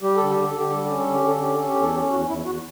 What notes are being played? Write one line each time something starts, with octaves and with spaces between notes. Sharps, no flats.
G3 G4
D3 A4
G4
D3
A4
D3 G4
G3 A4
C#4 G4
A4
D3
G4
D3 A4
C#4 G4
C#4 A4
G4
E2
A4
C#4 G4
E2 F#4
E2 E4
E2 F#4